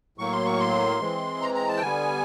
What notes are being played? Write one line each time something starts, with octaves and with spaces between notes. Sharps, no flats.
A2 F#3 A#3 C#6
C6
C#6
C6
E3 G#3 C4
A#5
A#5
A5
G5
D3 G3 B3 G#5